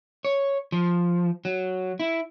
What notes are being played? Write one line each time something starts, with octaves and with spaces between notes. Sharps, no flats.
C#5
F3
F#3
E4